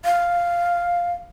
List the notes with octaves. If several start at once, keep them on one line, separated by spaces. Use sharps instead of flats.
F5